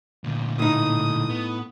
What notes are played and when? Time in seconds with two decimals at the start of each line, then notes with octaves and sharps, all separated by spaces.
0.24 D2 A#2
0.59 A2 D#4 D#6
1.29 B3